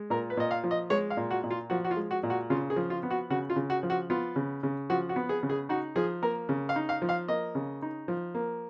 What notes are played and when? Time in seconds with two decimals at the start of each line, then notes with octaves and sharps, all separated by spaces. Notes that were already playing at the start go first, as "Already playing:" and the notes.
Already playing: G#3
0.10 A#2 A#4
0.30 B4
0.37 A#2 D#5
0.51 F5
0.64 F3
0.71 D#5
0.90 G#3 C#5
1.10 F5
1.17 A#2
1.31 F#4
1.44 A#2
1.50 F4
1.70 F3 F#4
1.84 F#4
1.91 F4
1.97 G#3
2.11 F#4
2.23 A#2
2.30 F#4
2.50 C#3 F4
2.70 G#4
2.76 F3
2.90 F4
3.03 B3
3.10 F#4
3.30 C#3 F#4
3.50 F4
3.56 C#3
3.70 F#4
3.83 F3
3.90 F#4
4.10 B3 F4
4.36 C#3
4.63 C#3
4.90 F3 F#4
5.09 F#4
5.16 B3
5.29 G#4
5.43 C#3
5.49 G#4
5.69 D#4 F#4
5.96 F3 G#4
6.22 A#3 A#4
6.49 C#3
6.69 F5
6.76 D#4
6.89 F5
7.02 F3
7.09 F5
7.28 A#3 D#5
7.55 C#3
7.82 D#4
8.08 F3
8.35 A#3